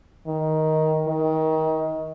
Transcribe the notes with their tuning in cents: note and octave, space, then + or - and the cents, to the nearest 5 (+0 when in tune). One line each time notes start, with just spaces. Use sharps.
D#3 +10
D#3 +25